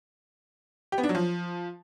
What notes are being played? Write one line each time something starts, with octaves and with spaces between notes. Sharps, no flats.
G4
B3
D4
F#3
F3